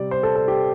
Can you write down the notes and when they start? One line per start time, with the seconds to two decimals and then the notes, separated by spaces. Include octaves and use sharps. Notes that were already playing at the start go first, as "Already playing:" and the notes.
Already playing: C3 G3 D5
0.11 C5
0.23 A4
0.35 A4
0.48 G4